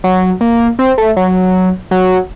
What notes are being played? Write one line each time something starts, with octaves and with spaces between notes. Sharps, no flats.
F#3
A#3
C4
A3
F#3
F#3